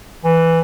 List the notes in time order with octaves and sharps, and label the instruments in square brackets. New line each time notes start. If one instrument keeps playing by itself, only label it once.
[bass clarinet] E3